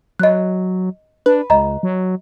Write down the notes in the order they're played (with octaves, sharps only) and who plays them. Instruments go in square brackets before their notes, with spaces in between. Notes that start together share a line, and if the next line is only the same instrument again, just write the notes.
[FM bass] F#3 [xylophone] D#5 F#6
[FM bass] D4 [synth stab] B4
[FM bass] C#2 [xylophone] D#5 A#5
[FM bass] F#3